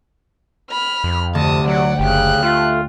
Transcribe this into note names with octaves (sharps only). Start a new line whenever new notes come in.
B5 F6
F2
D2 C3 A5 D#6
F#3 D5 F#5
F#1 C#3 G4 F#6
A3 F4